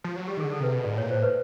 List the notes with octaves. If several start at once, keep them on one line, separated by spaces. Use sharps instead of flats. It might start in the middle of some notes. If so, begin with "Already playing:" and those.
F3
F#3
G3 G4
D#3
D3 G#4
A4
C3 B4
B2
G#2 D5
A2
A#2 C#5
A2 C5
B4